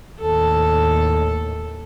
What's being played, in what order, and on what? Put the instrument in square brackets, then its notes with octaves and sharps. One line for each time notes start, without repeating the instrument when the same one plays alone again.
[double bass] D#2 A2 [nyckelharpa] A4